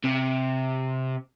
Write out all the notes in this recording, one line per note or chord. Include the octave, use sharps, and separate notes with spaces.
C3